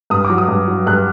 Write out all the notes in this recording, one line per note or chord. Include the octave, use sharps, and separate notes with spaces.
G2 D#6
D6
F#3
D#6
G2
F#3
G2 F#6